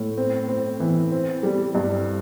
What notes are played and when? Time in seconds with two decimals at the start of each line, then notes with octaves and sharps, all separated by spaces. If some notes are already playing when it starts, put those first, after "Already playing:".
Already playing: A2
0.17 C4
0.48 C4
0.80 E3
1.12 C4
1.43 G3
1.75 G2